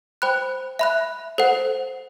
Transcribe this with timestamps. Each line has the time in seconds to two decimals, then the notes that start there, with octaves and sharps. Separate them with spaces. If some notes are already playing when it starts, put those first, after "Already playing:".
0.22 C5 G5 B5 F#6
0.79 E5 B5 F#6
1.38 A4 C5 F#5